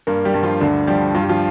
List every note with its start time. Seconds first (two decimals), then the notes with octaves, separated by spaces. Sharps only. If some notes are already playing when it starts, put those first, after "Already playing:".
0.07 G2 A#3 A#4
0.25 G3 G4
0.34 G2
0.43 F3 F4
0.60 D2 D3 D4
0.87 F3 G3 G4
1.15 G2 F4
1.22 G4
1.29 F3 F4